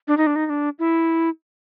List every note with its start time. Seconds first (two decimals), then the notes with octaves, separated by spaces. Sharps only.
0.08 D4
0.17 D#4
0.27 D4
0.36 D#4
0.46 D#4
0.50 D4
0.79 E4